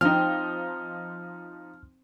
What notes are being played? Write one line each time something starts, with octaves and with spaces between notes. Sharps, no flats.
F3 C4 D#4 F6